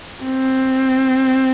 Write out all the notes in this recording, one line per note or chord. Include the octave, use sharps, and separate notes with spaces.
C4